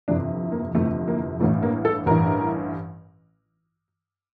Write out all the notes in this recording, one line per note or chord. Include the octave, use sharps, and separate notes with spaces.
G1 F2 C3 E3 D4
A#3
G1 F2 C3 E3 A3
A#3
A1 G2 E3 A3
A#3
A4
A1 G2 E3 A#4